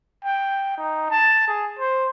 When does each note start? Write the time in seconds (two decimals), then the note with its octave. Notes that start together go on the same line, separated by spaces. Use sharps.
0.24 G5
0.78 D#4
1.11 A5
1.48 G#4
1.79 C5